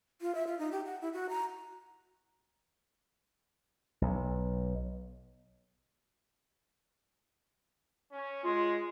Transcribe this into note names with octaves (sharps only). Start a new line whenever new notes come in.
F4
E5
F4
D#4
G4
F#5
E4
F#4
A#5
B1
C#4
G#3 F4